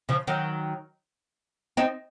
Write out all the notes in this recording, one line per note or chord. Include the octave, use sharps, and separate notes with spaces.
C#3 F3
D#3 F#3
C4 D#4